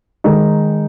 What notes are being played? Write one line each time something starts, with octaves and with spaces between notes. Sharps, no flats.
D#3 G#3 D#4